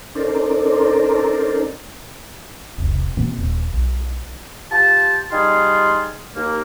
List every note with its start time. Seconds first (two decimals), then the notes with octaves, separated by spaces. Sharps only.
0.15 C#4 D#4 A4 A#4 C5 D5
2.78 E1 B1 C3
3.17 B2 E3 A#3 C4
3.39 D#1
3.74 B1
4.71 F4 G4 C5 A5
5.31 G3 D#4 F4 G#4 C6
6.35 D#2 A#3